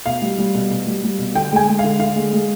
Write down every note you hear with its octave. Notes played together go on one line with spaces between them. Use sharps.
B2 F5
G3
G3
B2
B2
G3
G3
B2
D3 G5
G#3 G#5
G#3
F5
D3
D3 F5
G#3
G#3